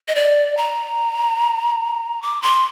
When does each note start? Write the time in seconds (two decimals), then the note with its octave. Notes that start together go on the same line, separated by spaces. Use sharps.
0.08 D#5
0.15 D5
0.57 A#5
2.22 D6
2.42 C6